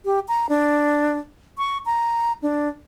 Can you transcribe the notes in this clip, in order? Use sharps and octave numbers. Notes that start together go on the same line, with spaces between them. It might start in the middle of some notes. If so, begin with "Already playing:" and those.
G4
A#5
D4
C#6
A#5
D4